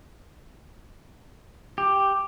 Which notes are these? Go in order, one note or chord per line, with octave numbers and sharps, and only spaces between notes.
G4